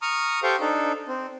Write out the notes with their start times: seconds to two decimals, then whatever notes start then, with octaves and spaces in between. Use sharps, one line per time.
0.02 A#5 C#6 D#6 F6
0.43 G4 A4 C5 F5 G5 C#6
0.61 D4 D#4 A4
1.08 C4